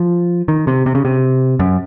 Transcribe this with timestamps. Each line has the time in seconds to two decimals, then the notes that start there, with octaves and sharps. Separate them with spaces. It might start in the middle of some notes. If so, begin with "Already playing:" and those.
Already playing: F3
0.48 D#3
0.67 C3
0.86 C3
0.95 C#3
1.05 C3
1.59 F#2